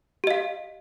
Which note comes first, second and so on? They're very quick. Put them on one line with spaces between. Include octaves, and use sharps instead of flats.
G4 D#5 F5